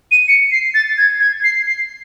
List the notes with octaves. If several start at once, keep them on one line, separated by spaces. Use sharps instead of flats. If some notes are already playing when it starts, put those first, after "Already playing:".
D#7
C#7
C7
A6
G#6
G#6
C7
C7